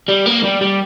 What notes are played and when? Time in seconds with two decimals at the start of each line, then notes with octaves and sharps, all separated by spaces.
0.08 G3
0.26 A#3
0.43 G3
0.61 G3